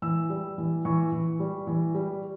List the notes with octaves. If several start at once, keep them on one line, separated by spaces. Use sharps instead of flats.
E3 E6
G3
E3
E3 C#6
E3
G3
E3
G3